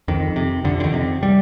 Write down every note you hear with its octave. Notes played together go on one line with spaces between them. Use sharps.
F2 D#3
C3
F2 D3
D3
D#3
C3
G3